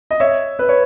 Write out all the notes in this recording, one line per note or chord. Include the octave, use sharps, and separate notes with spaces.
D#5
C#5 E5
B4
C#5